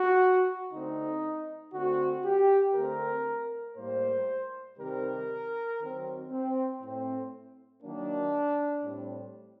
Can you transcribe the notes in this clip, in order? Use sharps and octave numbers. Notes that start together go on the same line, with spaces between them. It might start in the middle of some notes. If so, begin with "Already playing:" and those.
Already playing: F#4
D3 A3 C4 D#4
D3 A3 C4 F#4
G4
D3 A3 C4 A#4
A2 G3 A#3 C5
C3 D#3 G3 C4 A#4
D#3 F#3 C4
C4
A2 A3 C4
D#3 F#3 A#3 D4
A2 G3 C4